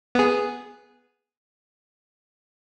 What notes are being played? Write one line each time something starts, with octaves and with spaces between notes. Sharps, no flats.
B3 G#4